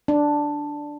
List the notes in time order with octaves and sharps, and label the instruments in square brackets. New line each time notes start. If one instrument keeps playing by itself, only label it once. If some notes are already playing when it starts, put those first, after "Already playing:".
[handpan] D4